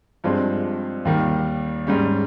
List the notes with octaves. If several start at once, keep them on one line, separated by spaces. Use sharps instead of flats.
G2 F3 G#3 C4
D#2 D#3 G3
G#2 G3 C#4